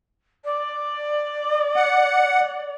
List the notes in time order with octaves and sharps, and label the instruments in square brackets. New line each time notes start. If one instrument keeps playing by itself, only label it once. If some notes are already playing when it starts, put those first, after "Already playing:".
[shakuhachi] D5
[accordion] F#5